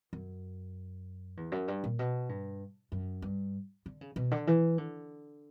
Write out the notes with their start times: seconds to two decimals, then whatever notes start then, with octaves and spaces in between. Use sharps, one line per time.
0.13 F#2
1.37 E2
1.52 F#2
1.68 G2
1.84 A#2
1.99 B2
2.29 G2
2.92 F#2
3.22 G2
3.86 D3
4.01 C#3
4.16 B2
4.31 D3
4.47 E3
4.78 D3